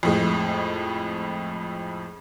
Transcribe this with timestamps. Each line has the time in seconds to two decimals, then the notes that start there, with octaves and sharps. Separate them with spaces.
0.03 F2 A2 G#3